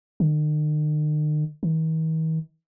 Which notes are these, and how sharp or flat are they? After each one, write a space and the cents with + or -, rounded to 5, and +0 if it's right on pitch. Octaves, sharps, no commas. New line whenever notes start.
D#3 -45
D#3 +45